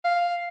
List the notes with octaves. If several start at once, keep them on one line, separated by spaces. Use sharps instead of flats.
F5